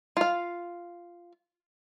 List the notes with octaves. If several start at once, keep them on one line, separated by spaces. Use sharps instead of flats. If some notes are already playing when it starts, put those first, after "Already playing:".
F4 F5